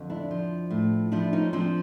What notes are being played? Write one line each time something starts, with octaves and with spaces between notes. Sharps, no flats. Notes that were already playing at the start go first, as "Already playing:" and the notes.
Already playing: F2 D3
D4 E4
F3
A2
F3 D4 E4
C#4 D#4
F3 C4 D4